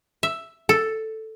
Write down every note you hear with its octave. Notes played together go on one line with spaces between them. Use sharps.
E5
A4